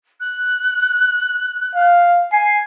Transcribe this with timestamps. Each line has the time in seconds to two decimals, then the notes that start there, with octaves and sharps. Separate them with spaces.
0.20 F#6
1.75 F5
2.32 G#5 C7